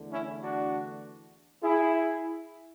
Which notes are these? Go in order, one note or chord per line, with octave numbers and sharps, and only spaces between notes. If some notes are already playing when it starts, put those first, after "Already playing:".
Already playing: E2 D3 A3
C#4 E4
D4 F#4
E4 G#4